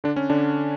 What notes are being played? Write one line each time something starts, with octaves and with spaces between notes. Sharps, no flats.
D3 D4
C#4
D3 D4